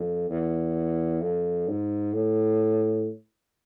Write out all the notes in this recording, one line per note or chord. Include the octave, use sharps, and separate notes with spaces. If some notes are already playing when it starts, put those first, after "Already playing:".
Already playing: F2
E2
F2
G#2
A2